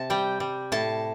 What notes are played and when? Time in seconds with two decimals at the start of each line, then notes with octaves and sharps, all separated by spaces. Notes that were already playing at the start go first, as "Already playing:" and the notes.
Already playing: C3 A5
0.10 G3 G5
0.40 G3
0.72 A2 A5